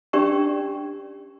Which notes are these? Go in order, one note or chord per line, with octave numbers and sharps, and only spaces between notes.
C#4 D4 G4 D5 G5 C#6